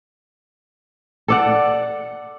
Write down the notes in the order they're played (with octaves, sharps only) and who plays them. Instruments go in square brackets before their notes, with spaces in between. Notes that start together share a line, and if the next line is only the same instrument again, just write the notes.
[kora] A4 D5 F#5